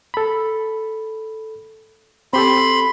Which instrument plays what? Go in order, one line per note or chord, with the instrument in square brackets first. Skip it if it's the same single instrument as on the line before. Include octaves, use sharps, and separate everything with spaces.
[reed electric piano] A4 B5
[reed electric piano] C4 G4 A4 [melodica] B5 C6